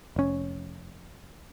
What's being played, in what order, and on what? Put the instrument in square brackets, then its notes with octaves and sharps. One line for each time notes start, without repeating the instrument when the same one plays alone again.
[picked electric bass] F1 C#4